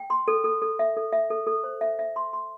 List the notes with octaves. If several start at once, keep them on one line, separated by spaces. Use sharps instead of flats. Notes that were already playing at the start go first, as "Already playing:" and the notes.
Already playing: G5
C6
A4
A4
A4
E5
A4
E5
A4
A4
C5
E5
E5
C6
C6